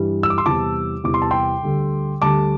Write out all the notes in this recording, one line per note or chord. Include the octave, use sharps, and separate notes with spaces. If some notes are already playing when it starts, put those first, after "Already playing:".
Already playing: G2 E3 G3
E6
D6
C6 E6
E2 C3 E3 G3 A5 D6
E2 C3 E3 G3 D6
C6
A5
G5 C6
D2 D3 G3
D2 D3 G3 A5 D6